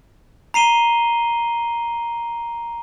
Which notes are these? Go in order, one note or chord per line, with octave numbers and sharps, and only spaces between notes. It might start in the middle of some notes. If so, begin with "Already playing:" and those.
A#5 C7 D#7 G7